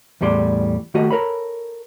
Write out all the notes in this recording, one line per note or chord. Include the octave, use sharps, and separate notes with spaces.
E2 A2 G3 D5 C6
D#3 A3 F#4 G4 D#5
A4 A#4 C#5 B5